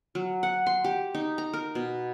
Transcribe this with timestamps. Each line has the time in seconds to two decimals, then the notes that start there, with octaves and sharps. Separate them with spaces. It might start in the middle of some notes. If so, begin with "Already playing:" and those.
0.15 F#3
0.43 F#5
0.67 C6
0.84 G4
1.15 D#4
1.38 A#5
1.53 A#4
1.75 B2